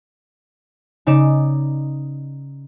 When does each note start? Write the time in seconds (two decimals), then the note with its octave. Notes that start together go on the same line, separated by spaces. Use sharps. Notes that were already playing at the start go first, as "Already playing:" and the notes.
1.07 C#3 D#4 D5 E7